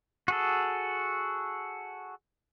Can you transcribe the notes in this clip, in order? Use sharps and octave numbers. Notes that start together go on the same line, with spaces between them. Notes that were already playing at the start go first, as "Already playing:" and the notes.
F#4 G#4 A4